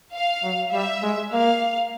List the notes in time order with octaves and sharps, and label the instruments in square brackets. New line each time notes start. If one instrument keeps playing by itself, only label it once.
[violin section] F5
[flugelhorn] F#3
[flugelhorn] G3 [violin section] E5
[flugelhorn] G#3
[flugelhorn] A#3 [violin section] F5